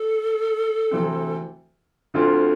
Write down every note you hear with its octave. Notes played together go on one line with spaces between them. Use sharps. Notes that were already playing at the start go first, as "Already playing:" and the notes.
Already playing: A4
D2 C3 E3 A3 C4
D2 D3 A3 C4 F4